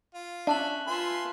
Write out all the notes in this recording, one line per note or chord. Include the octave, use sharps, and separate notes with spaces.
F4
C#4 D4 E5 A5 F#6 F#7
F4 B4 E5 G#5 C6